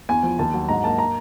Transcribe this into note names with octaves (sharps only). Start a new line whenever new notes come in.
E2 G#5
F3
D#2 A5
F#3
G#2 A#5
A#3 A5
A#5